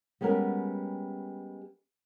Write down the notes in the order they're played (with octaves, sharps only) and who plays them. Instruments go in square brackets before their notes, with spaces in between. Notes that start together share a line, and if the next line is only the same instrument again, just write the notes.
[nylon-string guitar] G3 G#3 B3 C#4 A#4